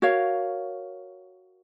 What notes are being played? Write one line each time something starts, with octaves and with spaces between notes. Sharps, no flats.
F#4 A#4 C#5 F5